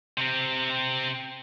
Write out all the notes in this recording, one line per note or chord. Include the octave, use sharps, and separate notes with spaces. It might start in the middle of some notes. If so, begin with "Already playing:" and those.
C3 C4